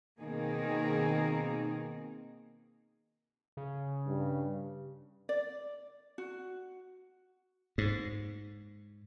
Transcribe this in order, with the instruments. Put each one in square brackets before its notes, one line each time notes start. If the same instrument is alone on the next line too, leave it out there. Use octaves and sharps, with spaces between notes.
[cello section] B2 D#3 A#3 C4 D#4 G#4
[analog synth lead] C#3
[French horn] G2
[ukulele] D5
F#4
[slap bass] G#2